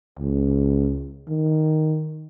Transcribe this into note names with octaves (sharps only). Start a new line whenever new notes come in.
C#2
D#3